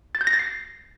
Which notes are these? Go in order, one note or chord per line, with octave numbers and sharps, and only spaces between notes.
A6
G6
A#6
A6
C7